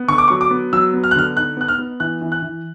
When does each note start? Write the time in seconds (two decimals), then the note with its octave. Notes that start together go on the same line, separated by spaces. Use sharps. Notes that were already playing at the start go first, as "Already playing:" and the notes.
Already playing: B3
0.08 D3 C#6
0.18 D6
0.28 F#3 C#6
0.41 D6
0.51 B3
0.73 F#3 E6
0.93 B3
1.04 F6
1.11 F#6
1.15 D3 F6
1.36 D#4 F#6
1.57 B3 F#6
1.68 F6
1.79 B3
2.00 E3 F#6
2.21 E3
2.32 F#6
2.43 E3